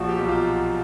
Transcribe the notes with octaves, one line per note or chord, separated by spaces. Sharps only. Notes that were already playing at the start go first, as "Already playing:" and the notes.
Already playing: A#1 F3 F#4
G4
B1
F4